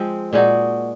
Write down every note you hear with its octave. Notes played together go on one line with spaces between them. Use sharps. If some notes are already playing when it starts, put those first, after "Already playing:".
Already playing: F3 G#3 C4
A#2 G#3 D#4 F#4